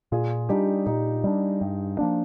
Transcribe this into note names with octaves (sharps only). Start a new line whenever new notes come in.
A#2 F4 G#4
G3 D4 D#4 G4
A#2 D#4 G4
G3 D4
G2
F3 A#3 D4